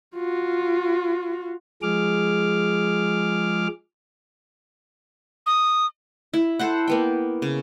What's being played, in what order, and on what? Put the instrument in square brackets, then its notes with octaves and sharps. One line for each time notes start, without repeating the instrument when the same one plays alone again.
[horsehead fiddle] F4 F#4
[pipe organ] F3 G#3 G#4 D6 F6
[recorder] D#6
[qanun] E4
A4 C5 F#5
A#3 B3 G5
C#3